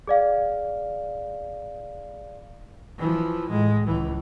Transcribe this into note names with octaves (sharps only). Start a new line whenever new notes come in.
G#4 D5 F5
E3 F3
A2 G#3
C#2 E3